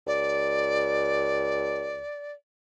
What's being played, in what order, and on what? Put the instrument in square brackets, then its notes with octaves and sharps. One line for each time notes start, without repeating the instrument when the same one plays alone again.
[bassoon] C#2 [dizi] D5